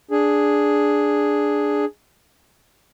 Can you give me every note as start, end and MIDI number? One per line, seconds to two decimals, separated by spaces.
0.11 1.85 62
0.11 1.85 68